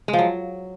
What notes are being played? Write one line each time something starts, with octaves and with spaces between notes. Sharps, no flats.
G#3
F3
F#3